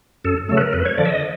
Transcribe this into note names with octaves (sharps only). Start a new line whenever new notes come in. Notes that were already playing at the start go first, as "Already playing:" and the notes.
F#2 A4
C#3 F#3 A3 A4
B4
A#4
F2 B4
C#5
D3 F3 D5
E5
D#5